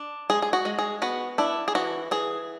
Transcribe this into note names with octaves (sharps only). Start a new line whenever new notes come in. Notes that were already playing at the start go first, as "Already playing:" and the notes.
Already playing: D4
G#3 G#4
G#4
F#4
G#3
G#4
B3 F#4
D4 E4
G#4
E3 F#4
E3 G#4